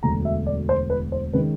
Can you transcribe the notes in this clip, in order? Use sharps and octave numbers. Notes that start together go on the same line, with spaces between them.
E1 D2 D3 F#3 A#5
E5
D5
C5
B4
C5
D#3 G#3 C#4 B4